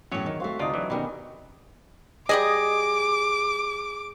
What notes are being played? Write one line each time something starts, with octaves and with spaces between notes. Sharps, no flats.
E2 A2 F#3 C#4 C#5
D#3
A3 C4 F#4 F5
D2 C3 D4 D#4 F4 D5
E3 F#3
B2 D#3 G3 C#4 G#5
G3 G#4 D5 D#5 D6